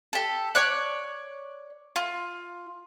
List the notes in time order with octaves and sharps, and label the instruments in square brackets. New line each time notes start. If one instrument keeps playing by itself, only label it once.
[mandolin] G4 A4
C#5 D5 F#6
F4